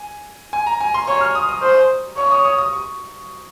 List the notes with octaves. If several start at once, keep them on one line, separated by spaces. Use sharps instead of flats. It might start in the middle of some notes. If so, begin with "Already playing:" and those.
Already playing: G#5
G#5
A#5
G#5
C6
C#5 C#6
F6
D#6
D#6
C5
C#5 C#6
D#6
D#6
D#6
C#6